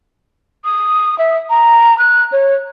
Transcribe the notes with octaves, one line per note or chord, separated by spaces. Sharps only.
D#6
E5
A#5
F#6
C#5